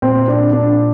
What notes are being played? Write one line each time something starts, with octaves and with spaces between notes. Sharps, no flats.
A#2 C4
D4
D4